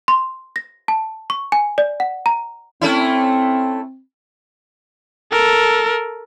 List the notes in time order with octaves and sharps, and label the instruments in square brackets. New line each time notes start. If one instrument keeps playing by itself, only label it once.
[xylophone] C6
A#6
A5
C#6
G#5
D5
F#5
A#5
[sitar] A3 C#4 E4 [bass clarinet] C4
[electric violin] A4 A#4